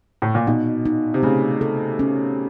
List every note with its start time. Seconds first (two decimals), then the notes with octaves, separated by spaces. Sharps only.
0.22 A2
0.35 A#2
0.47 B2 D#4
0.86 D#4
1.14 C3
1.23 C#3 A3
1.61 A4
1.99 C#4